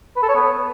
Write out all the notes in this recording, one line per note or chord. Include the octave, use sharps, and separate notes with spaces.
B4
A4
C#5
B3